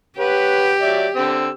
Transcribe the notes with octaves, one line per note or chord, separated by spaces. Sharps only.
G4 B4 C#5 F#5
F#3 D5 E5
D3 C4 E6